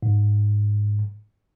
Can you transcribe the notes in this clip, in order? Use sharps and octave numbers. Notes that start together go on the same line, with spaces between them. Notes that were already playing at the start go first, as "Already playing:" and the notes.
G#2